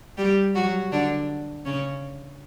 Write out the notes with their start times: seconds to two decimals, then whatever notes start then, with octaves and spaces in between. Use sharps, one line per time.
0.17 G3 G4
0.54 F#3 F#4
0.92 D3 D4
1.65 C#3 C#4